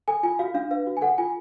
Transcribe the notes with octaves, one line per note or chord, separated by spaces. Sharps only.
A4 G#5
F4 G#5
F#4 F5
D4 F5
B4 F5
F#4
G#5
A4 F#5
F4 G#5